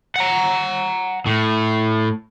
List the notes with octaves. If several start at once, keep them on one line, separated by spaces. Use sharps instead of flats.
F#5 A#5
A2